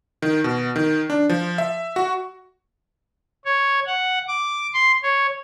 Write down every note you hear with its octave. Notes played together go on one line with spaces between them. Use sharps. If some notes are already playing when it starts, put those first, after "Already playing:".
D#3
B2
D#3
D4
F3
E5
F#4
C#5
F#5
D6
C6
C#5